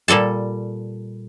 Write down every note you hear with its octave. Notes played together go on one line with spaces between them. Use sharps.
A#2 G3 A4 A5